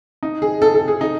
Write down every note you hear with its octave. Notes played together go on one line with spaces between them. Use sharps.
D#4
G#4
A4
A4
G#4
D#4